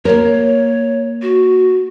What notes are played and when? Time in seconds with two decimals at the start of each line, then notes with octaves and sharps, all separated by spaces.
0.05 A#3 A#4 C#5
1.22 F#4